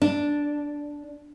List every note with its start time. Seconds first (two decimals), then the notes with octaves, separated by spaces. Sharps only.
0.02 D4